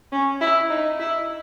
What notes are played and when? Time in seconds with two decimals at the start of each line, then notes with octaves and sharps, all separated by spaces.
0.12 C#4
0.41 E4
0.70 D#4
0.99 E4